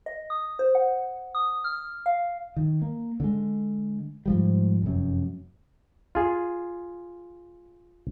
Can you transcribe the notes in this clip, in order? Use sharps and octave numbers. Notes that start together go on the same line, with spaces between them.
D#5
D#6
C5
F#5
D#6
F6
F5
D#3
A#3
D3 G#3
G#2 F3 G3
F1 F#2
F4 G#4